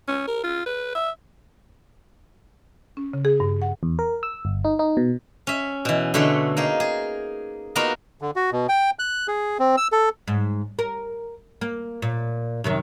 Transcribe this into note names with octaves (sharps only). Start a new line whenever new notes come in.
C#4
A#4
F4
B4
E5
C#4
C#3
G#4
G2
F#5
E2
A#4
E6
G1
D#4
D#4
B2
C#4 E5
B2 E3
B2 D3 A3 C#5 E5 C6
A#3 D#4 G#4
G#4
A#3 B3 D#4 F4 F#4 A#4
D3
F#4
B2
G5
F#6
G#4
C4
E6
A4
G#2
A#4
A#3
A#2
F#2 C3 D#3